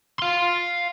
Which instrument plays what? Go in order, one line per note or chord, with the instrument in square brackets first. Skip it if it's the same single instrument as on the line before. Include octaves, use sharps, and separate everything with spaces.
[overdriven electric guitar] F5 C6